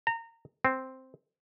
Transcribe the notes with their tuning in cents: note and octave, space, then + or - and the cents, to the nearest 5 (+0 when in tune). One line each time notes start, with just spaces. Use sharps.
A#5 -25
C4 +0